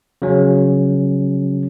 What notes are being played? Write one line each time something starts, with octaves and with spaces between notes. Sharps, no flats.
C#3 F#3 C#4